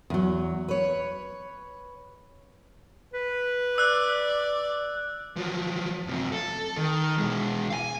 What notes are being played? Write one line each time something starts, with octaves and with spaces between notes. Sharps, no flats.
E2 F#3
B4 C#5
B4
D5 E6 F#6
F3 F#3
F#2 C3
A4
D#3
B2 G#3
F5 G#5